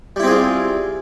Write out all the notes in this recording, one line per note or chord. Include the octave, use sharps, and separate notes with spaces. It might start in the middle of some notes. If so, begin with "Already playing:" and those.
G3 C4 E4 F4 G#4